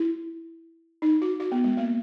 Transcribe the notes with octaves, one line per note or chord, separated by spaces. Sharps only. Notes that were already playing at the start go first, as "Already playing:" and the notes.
Already playing: E4
D#4
F#4
F#4
B3
G#3
A#3